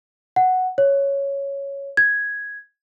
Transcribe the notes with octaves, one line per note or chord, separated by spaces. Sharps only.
F#5
C#5
G#6